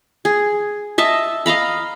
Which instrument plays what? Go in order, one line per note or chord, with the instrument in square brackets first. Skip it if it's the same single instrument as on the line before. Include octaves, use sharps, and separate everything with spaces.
[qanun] G#4
D#5 E5 A5
D#5 F5 A#5 B5